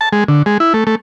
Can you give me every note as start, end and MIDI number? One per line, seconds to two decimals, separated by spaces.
0.01 0.09 81
0.12 0.24 56
0.29 0.42 50
0.46 0.58 56
0.60 0.73 64
0.74 0.84 57
0.87 0.95 57